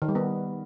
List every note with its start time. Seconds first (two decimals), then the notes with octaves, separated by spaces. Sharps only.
0.02 D#3
0.08 G3
0.15 B3